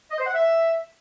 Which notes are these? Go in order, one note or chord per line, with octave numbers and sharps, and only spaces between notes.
D#5
C5
F#5
E5